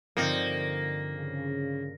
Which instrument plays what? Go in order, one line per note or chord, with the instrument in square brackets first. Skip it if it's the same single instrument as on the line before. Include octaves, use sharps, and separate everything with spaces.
[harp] G2 D3 [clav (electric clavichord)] F3 C4 D#4 [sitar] A#3
[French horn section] C#3